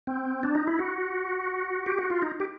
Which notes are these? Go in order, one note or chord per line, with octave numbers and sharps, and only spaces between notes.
C4
D4
D#4
E4
F#4
G4
F#4
F4
D#4
G4